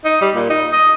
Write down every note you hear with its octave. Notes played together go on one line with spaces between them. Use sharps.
D#4
G3
A#2
D#4
D#5